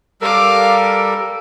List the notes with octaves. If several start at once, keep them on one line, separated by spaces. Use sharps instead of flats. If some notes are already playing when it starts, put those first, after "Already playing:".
G3 A4 A#4 F5 D6